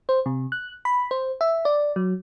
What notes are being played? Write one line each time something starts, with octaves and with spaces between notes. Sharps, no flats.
C5
C3
F#6
B5
C5
E5
D5
F#3